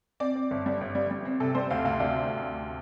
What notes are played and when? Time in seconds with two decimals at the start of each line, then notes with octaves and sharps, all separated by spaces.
0.20 C4 D5
0.36 C4
0.51 G1
0.66 G3
0.81 G1
0.95 G3
1.11 G3
1.25 C4
1.40 C3 A4
1.55 G3 C5
1.71 D2 F5
1.85 D2 F5
2.00 D2 D5